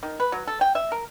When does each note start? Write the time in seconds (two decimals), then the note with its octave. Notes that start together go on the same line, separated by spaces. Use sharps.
0.03 D#3
0.20 B4
0.32 F#3
0.47 A4
0.61 G5
0.75 E5
0.92 A#4